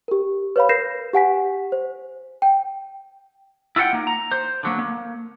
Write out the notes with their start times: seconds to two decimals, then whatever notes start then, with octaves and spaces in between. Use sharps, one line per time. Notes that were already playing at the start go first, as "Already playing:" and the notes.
0.08 G4 A#4
0.56 B4 C#5 F5 B5
0.69 A#4 B4 G6 A#6 C7 E7
1.13 G4 F#5 G#5 B6
1.72 C5
2.42 G5
3.76 E4 F4 B4 F#5 G5
3.93 A#3 D#4
4.07 A#5
4.32 C5
4.63 D3 F#3 A#3
4.79 A#3